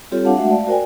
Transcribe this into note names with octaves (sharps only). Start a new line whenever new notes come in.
G3 C4 F4 G4 A4 C#5
D4 F5 F#5 A5
G#3 A3 F#4 E5 F#5
D5 F5 A5
F#4 A#4 C5 D5 G5 G#5